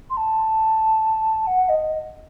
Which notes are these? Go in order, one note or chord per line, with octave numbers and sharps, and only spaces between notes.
C6
A5
F#5
D#5